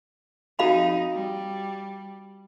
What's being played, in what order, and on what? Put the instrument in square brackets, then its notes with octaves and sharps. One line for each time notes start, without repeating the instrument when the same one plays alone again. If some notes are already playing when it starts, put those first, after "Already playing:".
[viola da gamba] F2 D#4 [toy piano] F#4 F5 B5
[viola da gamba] G3